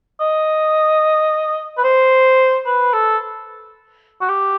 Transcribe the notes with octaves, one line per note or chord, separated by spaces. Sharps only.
D#5
B4
C5
B4
A4
F#4
G4